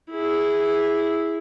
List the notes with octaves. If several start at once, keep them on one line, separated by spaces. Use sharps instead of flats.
E4 G#4